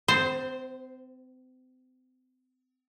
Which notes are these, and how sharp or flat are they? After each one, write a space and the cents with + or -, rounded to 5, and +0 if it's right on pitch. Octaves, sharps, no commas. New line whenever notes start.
C4 -35 C5 +0